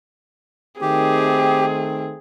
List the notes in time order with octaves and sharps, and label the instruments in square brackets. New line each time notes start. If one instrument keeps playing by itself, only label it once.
[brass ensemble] D#3 A3 [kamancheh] C4 [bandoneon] G4 [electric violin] G#4